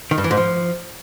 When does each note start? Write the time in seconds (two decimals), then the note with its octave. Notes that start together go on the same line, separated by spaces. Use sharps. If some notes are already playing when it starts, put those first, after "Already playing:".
0.11 D#3
0.18 G2
0.24 E3
0.31 G#2
0.37 F3